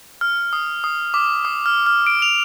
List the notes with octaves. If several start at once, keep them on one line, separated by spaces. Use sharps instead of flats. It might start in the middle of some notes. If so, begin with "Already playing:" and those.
F6
D#6
D#6
D6
D#6
F6
F6
D7
F7